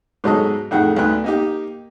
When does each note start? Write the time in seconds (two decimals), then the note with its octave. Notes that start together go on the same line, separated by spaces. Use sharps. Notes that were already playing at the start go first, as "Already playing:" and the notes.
0.24 G#2 B2 F#3 G#3 A4 D#5
0.71 F2 A2 D#3 G#4 F#5
0.96 D2 D#3 B3 F#6
1.24 A#3 D#4 G4